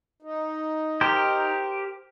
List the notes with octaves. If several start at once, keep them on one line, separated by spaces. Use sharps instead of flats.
D#4
G4 A#4 C5